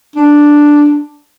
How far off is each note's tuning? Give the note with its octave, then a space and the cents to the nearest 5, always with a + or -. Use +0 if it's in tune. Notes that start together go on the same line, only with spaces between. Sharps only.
D4 +0